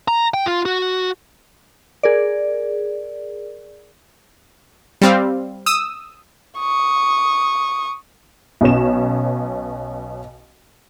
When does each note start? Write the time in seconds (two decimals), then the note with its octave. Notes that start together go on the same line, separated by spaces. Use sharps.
0.08 A#5
0.34 G5
0.46 F4
0.66 F#4
2.03 G#4 A#4 D5
5.02 G3 C4 F5
5.66 D#6 E6
6.59 C#6 D#6
8.61 B1 B2 C#4 E7